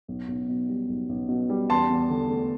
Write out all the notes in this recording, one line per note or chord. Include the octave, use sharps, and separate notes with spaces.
B1
B1
B2
G3
B1
B1
B2
G3
E2 A5 C6
E2
D3
A3